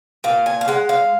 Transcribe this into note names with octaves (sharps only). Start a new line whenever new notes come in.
A#2 F5
G#5
F5
G#3 F#5
F5